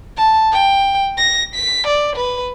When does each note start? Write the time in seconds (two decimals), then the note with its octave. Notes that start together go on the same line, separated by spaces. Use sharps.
0.17 A5
0.53 G5
1.18 A#6
1.55 B6
1.87 D5
2.16 B4